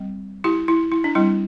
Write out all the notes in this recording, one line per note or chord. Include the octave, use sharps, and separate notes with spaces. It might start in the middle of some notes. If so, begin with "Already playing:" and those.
Already playing: G3 C4
E4 G4
E4
E4
D4
G3 C4 E4